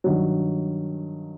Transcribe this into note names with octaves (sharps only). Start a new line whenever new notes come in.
G2 D#3 F#3